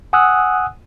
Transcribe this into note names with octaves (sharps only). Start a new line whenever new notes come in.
F#5 G#5 D#6 E6 F#6